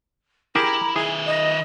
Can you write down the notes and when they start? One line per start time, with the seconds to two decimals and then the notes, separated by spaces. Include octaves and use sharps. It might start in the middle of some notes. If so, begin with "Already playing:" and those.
0.56 E4 G4 G#4 A#4 A#5
0.96 D#3 G#4 E5 G#5
1.25 D#5